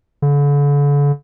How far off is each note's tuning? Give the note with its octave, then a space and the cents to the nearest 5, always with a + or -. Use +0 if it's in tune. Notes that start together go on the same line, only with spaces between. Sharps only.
D3 -40